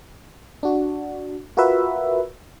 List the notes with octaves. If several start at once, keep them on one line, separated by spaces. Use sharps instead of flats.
D4 F#4
F4 F#4 A#4 B4 E5